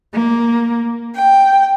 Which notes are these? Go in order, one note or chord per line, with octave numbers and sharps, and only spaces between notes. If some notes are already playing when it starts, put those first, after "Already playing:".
A#3
G5